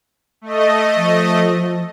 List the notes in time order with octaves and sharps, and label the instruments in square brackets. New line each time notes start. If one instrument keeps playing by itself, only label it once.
[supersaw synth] A3 D#5
[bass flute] F3